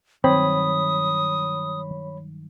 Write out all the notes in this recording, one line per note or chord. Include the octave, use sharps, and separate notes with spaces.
G2 D#3 F#3 C4 C#5 B5 D#6